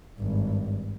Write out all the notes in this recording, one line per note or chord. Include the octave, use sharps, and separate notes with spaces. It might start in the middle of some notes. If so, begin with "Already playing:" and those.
G#1 G2